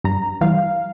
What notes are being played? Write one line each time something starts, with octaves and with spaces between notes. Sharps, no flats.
G2 A#5
E3 G3 F5